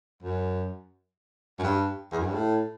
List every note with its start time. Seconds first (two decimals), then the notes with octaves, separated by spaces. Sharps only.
0.23 F#2
1.59 F#2
1.64 G2
2.12 E2
2.19 F#2
2.27 G2
2.34 A2